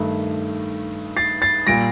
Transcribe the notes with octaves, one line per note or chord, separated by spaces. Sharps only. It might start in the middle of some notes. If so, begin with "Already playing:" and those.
Already playing: G2 D#3 A3
A6 C7
A6 C7
A#2 G3 A#6 D7